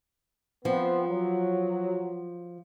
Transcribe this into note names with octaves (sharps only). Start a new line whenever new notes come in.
F3 B3 C4
F#3